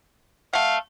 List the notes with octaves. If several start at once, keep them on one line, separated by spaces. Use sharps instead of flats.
A3 F5 F#5